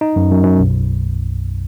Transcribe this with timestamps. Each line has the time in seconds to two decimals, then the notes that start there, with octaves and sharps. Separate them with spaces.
0.01 D#4
0.16 F#2
0.31 F#2
0.44 F#2
0.59 B1